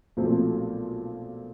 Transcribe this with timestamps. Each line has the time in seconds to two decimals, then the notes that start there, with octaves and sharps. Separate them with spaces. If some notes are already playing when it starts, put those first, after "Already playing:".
0.17 B1 A#2 F3 A3 C4